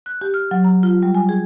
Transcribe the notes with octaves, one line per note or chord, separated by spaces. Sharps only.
F#6
G4
F6
F#3
A#5
F4
G3
G#5
G#4